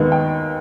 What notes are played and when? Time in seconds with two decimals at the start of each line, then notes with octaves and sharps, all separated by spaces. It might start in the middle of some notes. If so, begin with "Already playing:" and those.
Already playing: D#2 D#3 G#3 B3
0.12 G5